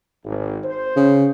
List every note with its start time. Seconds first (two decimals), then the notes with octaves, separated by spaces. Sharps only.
0.25 G#1
0.64 C5
0.96 C#3